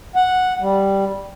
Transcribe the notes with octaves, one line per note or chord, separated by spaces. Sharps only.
F#5
G3